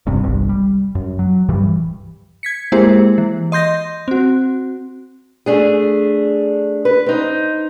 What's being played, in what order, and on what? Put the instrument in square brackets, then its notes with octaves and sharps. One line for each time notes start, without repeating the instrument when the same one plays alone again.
[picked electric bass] E1 G2 C3
G1 C2 G2
G3
F#2
F#3
D1 G2 E3 G3
[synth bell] G#6 B6 C#7
G#3 A#3 E4 G4 G#4 C5
E3
D#5 C6 G6 A#6
C4 F#4
[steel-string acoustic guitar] A3 D4 G#4
B4
C4 D#4